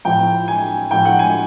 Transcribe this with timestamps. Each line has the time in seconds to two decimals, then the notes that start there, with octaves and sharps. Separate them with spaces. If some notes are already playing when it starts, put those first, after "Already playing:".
0.05 A2 F3 G5
0.48 G#5
0.91 A2 F3 G5
1.05 F#5
1.19 G#5